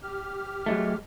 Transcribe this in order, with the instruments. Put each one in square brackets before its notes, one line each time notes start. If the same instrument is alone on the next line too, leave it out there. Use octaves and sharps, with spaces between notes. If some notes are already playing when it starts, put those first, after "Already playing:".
[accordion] G4 F6
[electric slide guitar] F#3 G#3 A3